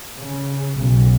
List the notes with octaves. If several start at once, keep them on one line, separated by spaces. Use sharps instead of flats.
C#3
B1